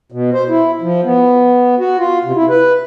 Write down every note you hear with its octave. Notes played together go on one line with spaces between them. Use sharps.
B2
C5
E4
F3
B3
F#4
F4
C3
E4
B4